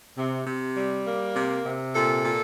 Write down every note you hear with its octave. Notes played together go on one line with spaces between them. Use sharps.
C3
C3
G3
A#3
C3
C3
A#2 A4
A#2